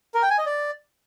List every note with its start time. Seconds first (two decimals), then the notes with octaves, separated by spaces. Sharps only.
0.15 A#4
0.22 G5
0.30 G#5
0.38 D#5
0.46 D5